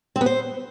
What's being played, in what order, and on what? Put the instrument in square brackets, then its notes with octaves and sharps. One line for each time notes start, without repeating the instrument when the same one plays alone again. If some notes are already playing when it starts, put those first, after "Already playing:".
[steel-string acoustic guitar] C4
B3
C5